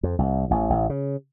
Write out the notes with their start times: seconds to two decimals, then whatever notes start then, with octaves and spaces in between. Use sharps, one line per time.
0.03 F2
0.19 C2
0.51 A1
0.70 A1
0.89 C#3